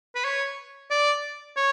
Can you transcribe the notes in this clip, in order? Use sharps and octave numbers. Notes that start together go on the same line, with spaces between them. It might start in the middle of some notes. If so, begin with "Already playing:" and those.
B4
C#5
D5
C#5